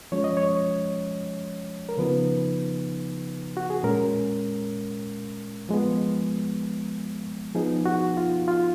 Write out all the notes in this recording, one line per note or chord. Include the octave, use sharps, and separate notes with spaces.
F3 G#3 C#4 C#5
D#5
C#5
A#4
C#3 F3 B3 D#4 B4
F#4
G#4
A#2 G#3 C#4 A#4
F3 G#3 B3
F3 B3 D#4 G#4
F#4
F4
F4